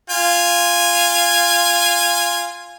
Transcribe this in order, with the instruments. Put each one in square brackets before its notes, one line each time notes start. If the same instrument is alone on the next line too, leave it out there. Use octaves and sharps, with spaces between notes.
[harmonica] F4 G#5